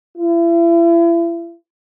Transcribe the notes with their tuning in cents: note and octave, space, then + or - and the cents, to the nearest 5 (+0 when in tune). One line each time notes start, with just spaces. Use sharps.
E4 +40